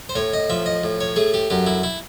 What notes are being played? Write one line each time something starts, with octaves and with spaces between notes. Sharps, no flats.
C5
A2 C#5
D#5
F3 E5
D#5
A2
C#5
A3 G#4
G4
F#2 G4
E4
E4